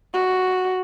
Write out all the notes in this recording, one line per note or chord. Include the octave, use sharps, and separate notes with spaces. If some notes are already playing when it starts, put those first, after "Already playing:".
F#4